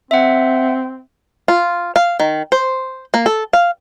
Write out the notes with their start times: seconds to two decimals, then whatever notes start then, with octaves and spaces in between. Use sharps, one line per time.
0.11 C4 E5 F#5
1.48 F4
1.96 F5
2.20 D#3
2.52 C5
3.14 A#3
3.26 A4
3.53 F5